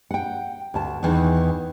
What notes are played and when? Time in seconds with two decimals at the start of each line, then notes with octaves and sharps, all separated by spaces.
0.11 F#5 G5
0.74 D2 A5
1.03 E2 D#3 E3